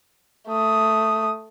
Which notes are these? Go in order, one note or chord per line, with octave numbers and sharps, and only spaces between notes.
A3 D#6